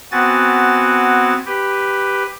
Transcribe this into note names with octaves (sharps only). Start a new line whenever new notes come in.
B3 C4 F#4 G#5 A6
G4 B4